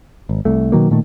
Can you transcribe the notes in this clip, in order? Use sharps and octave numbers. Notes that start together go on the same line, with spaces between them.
G#1
C2 A3
B2 D#3 F#3 A#3
A#2 D#3 A3